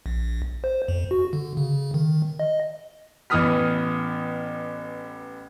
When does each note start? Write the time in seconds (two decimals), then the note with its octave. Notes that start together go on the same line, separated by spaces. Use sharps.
0.06 A#1
0.64 C5
0.88 F2
1.11 F#4
1.33 D3
1.57 C#3
1.94 D#3
2.40 D#5
3.30 A1 E3 B3 D#6 F6 B6